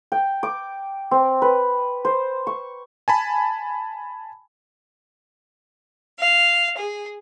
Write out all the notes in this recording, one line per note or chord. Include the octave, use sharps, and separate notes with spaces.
G5
D6
C4
B4
C5
C#6
G#5 A5 B5
F5
G#4